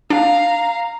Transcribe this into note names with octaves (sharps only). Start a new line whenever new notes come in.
D4 F5 A#5